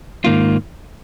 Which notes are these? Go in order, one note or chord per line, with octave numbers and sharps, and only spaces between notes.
G#2 D#3 A#3 F4